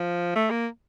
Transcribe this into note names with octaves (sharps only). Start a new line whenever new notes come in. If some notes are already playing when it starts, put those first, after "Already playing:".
Already playing: F3
A3
A#3